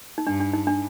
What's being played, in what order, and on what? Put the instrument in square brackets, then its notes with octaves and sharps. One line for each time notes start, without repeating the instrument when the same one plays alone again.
[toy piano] D#4
[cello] G2 [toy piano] D4
[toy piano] D4
D#4
D4